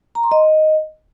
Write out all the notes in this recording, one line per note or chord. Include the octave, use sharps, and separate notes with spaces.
A#5
C6
D#5